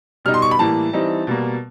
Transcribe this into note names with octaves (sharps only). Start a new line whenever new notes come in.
B2 G3 B3 D#4 F6
C6
C#6
B5
A2 E3 G3 A#3 A5
E3 G3 C4 D#4
B2 G3 A#3